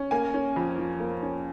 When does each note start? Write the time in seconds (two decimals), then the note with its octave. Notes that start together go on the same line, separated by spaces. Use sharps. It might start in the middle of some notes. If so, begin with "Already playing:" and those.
Already playing: C#4
0.11 A#3 G#5
0.34 C#4
0.56 F2
0.78 F3
1.00 A#3
1.22 C#4